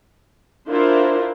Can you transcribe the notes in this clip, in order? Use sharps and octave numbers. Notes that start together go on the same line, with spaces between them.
D4 E4 F4 A#4 C5